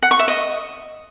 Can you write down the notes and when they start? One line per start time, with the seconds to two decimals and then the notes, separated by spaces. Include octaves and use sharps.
0.03 F#5
0.11 C#6
0.19 E5
0.28 D#5